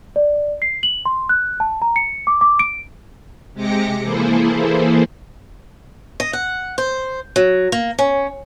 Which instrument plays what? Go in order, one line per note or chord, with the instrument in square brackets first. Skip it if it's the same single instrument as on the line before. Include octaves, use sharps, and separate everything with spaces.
[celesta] D5
C7
F#7
C6
F#6
A5
A#5
C#7
D6
D6
D7
[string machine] C3 G#3 G4 D6 A#6 C#7
E3 A#3 E4 G#4 A4 C5
[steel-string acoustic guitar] D#5
F#5
C5
F#3
A#3
C#4